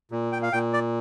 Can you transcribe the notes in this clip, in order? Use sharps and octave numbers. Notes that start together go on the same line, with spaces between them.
A#2
G5
F5
A#2 G5
D5